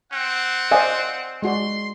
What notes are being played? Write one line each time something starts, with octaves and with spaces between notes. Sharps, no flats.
C4 F#5
C5 D5 D#5 F5 G#5
G#3 F#4 D5 C6